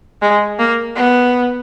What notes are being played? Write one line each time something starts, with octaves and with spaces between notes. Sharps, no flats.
G#3
A#3
B3